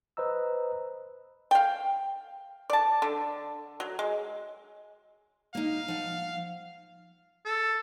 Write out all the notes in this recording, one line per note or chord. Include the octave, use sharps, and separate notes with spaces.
B4 C5 D#5 A#5 E6
F5 G5
D5 A5
D3
F#3
G#3
A#3 D#4 F5
F3 F#5
A4